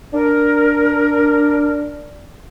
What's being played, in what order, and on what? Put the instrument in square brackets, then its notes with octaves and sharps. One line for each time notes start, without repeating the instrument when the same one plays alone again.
[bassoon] D4 [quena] A#4